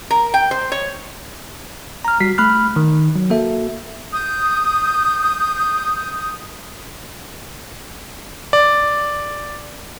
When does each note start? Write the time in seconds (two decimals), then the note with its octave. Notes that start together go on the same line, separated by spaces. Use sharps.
0.11 A#4
0.34 G5
0.51 C5
0.72 C#5
2.05 A#5 F6
2.20 G3 F#4 B6 C7
2.38 A3 B5 F6 F#6
2.76 D#3
3.16 F#3
3.30 A#3 F#4 A4 E5
4.12 D#6 G6
8.53 D5